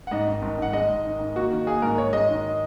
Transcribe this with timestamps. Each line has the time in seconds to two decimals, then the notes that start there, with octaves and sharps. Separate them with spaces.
0.07 F#5
0.11 G#2 D#5
0.27 G#1
0.42 G#1
0.58 G#2 F#5
0.73 G#3 D#5
0.89 G#2
1.04 D#3
1.20 G#2
1.36 A#3 F#4
1.51 D#3
1.67 A#3 G#4
1.82 G#2 A#4
1.98 G#2 C#5
2.13 G#3 D#5
2.29 D#3